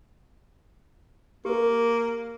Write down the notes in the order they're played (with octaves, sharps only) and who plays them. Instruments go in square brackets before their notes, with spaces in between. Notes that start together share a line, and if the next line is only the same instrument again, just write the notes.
[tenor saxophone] A#3 [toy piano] G4 A#4